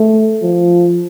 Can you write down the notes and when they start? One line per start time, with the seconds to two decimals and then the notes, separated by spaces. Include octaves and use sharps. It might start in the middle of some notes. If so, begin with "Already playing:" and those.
Already playing: A3
0.42 F3